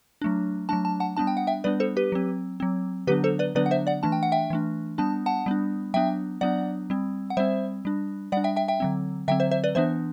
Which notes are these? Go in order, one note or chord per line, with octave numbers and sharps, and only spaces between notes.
F#3 A3 D4
F#3 A3 D4 A5
A5
F#5 A5
G3 B3 D4 A5
G5
F#5
E5 G5
G3 B3 D4 B4 D5
A4 C5
G4 B4
F#3 C4
F#3 C4
D3 F#3 B3 D4 G4 B4
A4 C5
B4 D5
D3 F#3 B3 D4 B4 D5
F#5
C5 E5
D5 F#5
E3 A3 D4 A5
G5
F#5
E5 G5
E3 A3 D4
G3 B3 D4 A5
F#5 A5
G3 B3 D4
F#3 B3 D4 E5 G5
F#3 B3 D4 D5 F#5
G3 C4
F#5
G3 C4 C5 E5
G3 D4
G3 D4 D5 F#5
E5 G5
E5 G5
E5 G5
D3 F#3 C4
D3 F#3 C4 E5 G5
C5 E5
C5 E5
B4 D5
E3 B3 D4 C5 E5